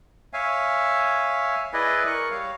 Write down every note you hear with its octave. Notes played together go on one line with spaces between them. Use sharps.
C#5 E5 F5 G#5
E4 G#4 B4 D5 D#5 G#5
A#4 C#6 F#6
G3 C#5 F5